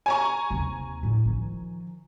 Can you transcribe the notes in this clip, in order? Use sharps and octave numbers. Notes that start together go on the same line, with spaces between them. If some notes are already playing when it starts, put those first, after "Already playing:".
G#5 A#5 C#6
D#2 C3
A2
D#3 F3